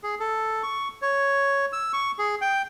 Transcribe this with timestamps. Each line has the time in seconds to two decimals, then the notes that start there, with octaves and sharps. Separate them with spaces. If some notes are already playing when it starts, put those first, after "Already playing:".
0.03 G#4
0.20 A4
0.63 C#6
1.02 C#5
1.73 E6
1.93 C#6
2.19 G#4
2.41 G5